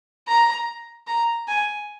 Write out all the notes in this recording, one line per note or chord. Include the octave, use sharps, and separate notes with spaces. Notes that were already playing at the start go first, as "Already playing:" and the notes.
A#5
A#5
G#5